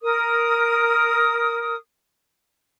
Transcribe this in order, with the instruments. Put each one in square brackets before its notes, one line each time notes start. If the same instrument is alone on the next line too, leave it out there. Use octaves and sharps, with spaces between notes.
[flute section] A#4 D#6